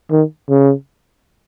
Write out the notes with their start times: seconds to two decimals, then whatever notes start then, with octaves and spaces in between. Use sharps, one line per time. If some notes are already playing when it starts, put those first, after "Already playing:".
0.12 D#3
0.49 C#3